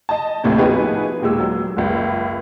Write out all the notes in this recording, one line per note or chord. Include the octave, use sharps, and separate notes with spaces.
D#5 A5
A1 D#2 A2 C3
F3 B3 D#4 F#4 G#4 B4
D#2 A#2 G#3 E6
F#3
F#1 C#2